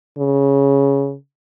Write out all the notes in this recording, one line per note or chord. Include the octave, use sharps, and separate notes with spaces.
C#3